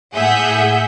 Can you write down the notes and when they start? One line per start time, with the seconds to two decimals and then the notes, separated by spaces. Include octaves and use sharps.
0.13 A2 G#4 E5 F#5 G#5 G6